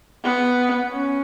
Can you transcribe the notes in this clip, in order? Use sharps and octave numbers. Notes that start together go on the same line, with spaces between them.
B3
C#4